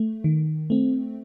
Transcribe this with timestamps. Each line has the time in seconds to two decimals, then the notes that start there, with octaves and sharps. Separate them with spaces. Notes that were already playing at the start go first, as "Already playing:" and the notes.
Already playing: A3
0.24 D#3
0.70 A3 C4